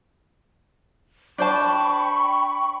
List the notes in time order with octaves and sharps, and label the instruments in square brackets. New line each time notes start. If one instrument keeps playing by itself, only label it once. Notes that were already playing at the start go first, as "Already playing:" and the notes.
[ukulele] D4 C5 A5 [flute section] G5 B5 C#6